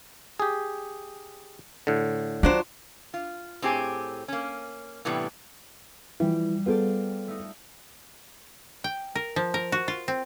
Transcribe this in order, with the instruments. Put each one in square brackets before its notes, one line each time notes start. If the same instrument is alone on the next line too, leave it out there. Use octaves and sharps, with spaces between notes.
[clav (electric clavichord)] G4 G#4
A2 D3
[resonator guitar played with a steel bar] F#3 D4 C5 [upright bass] F4
[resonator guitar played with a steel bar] F4
A2 C4 G4 G#4 G#5
A#3 C#4
A2 C3 E3 G3 B3
[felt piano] E3 F3 [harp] G3
[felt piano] B3 G#4 A4 [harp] F4 C5 D5
[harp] A3 D#4
[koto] G5
A#4
F3
A#4
F#4
F4
C4